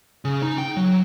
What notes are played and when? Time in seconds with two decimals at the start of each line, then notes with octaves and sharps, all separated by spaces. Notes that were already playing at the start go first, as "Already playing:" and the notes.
0.25 C#3
0.42 D#4
0.58 G5
0.77 F#3